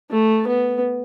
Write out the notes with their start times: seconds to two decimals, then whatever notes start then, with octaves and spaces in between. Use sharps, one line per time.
0.10 A3
0.47 B3